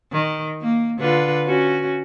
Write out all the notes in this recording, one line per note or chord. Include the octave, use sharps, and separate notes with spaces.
D#3
A#3
D3 F4 B4
C#4 F#4